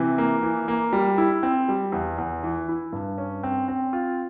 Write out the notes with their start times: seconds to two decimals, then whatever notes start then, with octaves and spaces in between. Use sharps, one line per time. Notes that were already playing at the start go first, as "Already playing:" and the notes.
Already playing: C3 E3
0.18 A#3
0.43 E3
0.68 A#3
0.93 G3
1.18 E4
1.43 C4
1.69 G3
1.92 E2
2.18 E2
2.43 E3
2.68 E4
2.93 G2
3.18 C#4
3.43 C4
3.68 C4
3.93 F4